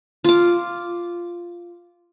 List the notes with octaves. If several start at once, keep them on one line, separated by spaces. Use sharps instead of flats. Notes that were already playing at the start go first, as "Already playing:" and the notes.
F4 D6